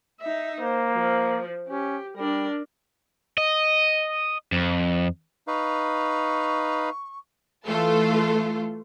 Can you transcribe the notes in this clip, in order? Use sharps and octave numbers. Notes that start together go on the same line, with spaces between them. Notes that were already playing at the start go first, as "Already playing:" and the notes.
D#4 E5
A#3 C5
F3
C#4 G4
G3 D4 A#4
D#5
F2
D#4 B4 F5 C#6
E3 A3 F4 A4